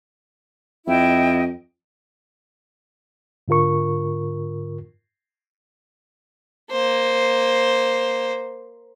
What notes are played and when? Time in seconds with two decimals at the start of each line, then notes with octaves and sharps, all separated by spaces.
0.87 F2 E4 D#5 G5
3.48 G#2 D3 F4 A#4 C#6
6.72 A#3 C5